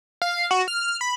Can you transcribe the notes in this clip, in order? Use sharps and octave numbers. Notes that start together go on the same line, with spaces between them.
F5
F#4
F6
B5